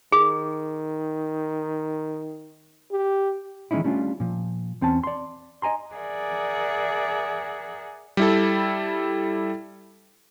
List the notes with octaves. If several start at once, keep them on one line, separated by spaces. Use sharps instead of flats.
D#3 G#4
G4
D#3 E3 G#3 C#4 D#4 E4
G3 A3 C#4 D4 F4
A#2 F3
E2 C4 C#4 A5
D5 C6
D#5 G#5 A#5 C6
G#4 A#4 D5 E5 F#5
G3 E4 A4